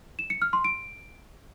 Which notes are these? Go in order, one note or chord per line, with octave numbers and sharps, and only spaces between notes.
E7
C#7
F6
C6
D7